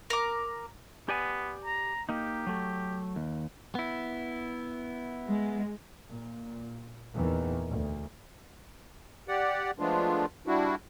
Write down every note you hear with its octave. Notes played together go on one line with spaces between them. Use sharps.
A#4 D6
B3 G4 D5 G#5
A#5
A#3 D#4 G4
F#3 A3
D#2
B3 E4
G#3
A#2
E2 A#2 D#3 E3
D2
G4 D5 F#5
F3 G#3 A3 B3 D4 F4
G3 D4 E4 F#4